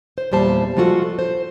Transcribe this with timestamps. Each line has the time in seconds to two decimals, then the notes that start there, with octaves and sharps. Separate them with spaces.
0.18 C5
0.32 E2 A#2 G3 C5 A5
0.77 F3 G#3 F4 F#4 A4
1.19 C5